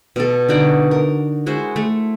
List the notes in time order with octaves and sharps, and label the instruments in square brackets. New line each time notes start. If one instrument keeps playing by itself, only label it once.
[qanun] B2 A4
D3 D#4 F#4 D5
A#4
G#3 E4 F#4 C5
A3